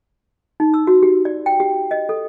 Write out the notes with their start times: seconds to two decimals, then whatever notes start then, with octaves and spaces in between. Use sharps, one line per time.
0.60 D#4
0.74 E6
0.87 F#4
1.03 G4
1.25 D5
1.46 G5
1.60 G4
1.91 D#5
2.09 A4